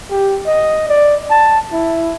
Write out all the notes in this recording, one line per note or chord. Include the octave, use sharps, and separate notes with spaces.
G4
D#5
D5
A5
E4